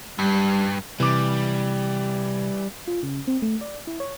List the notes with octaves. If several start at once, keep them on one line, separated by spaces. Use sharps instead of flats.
G2 G3
C3 E3 G3 D6
F4
C#3
C4
A3
D5
E4
C#5